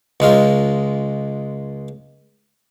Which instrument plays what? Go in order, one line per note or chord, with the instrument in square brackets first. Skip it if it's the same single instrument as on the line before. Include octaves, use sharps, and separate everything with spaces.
[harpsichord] C#2 G#3 F4